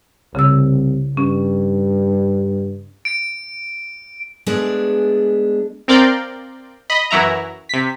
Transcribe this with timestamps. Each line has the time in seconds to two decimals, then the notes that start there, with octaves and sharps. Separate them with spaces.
0.35 C2 C#3 E6
1.17 G2 C#4
3.05 D7
4.47 G#3 A3 B3 D4 G#4 D5
5.88 C4 A#4 D5 F5 G5 C6
6.90 D#5 B5
7.11 F#2 E3 F#3 E4 A#5
7.69 C3 B6